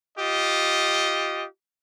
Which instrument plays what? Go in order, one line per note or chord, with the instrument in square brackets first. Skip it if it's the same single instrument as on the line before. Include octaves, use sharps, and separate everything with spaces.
[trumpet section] F4 G4 D#5